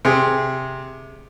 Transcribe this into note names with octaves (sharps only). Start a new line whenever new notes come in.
C3 G#4